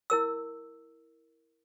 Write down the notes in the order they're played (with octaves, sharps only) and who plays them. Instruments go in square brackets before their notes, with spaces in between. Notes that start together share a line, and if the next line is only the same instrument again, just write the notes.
[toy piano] E4 A#4 E6